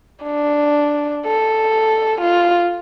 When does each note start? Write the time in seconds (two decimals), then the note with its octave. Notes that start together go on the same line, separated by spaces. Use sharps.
0.24 D4
1.26 A4
2.21 F4